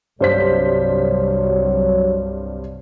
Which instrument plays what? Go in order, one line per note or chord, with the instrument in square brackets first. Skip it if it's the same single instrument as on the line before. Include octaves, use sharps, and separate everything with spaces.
[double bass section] C2 [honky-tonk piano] G2 C5 B6 [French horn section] F#3 C#5